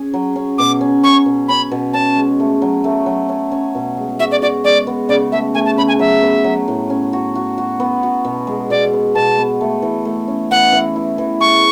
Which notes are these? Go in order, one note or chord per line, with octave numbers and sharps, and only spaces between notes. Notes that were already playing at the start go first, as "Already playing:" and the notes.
Already playing: C#4 G#4
F#3
C#4
B2 D6
C#4
C#4 C#6
B2
C#4 B5
B2
C#4 A5
G#3
A3
F#3
A3
F#3
C#4
C#4
B2
G#3
F#4 E5
D5
F#4 D5
G#3 D5
B3
C#3 D5
A3 E5
A3 G#5
A5
C#3 B5
G#5
F#3 E5
B3
F#3
A2
C#4
F#4
F#4
F#4
B3
F#4
B2
G#3
B2 D5
B3
B2 A5
B3
A3
E3
A3
C#4
E3 F#5
E3
E4
E3
G#4 C#6